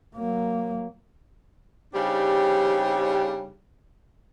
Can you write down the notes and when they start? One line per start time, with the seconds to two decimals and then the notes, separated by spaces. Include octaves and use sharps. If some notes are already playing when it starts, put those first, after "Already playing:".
0.15 F#3 A#3
1.94 C#3 G3 C4 D4 D#4 G4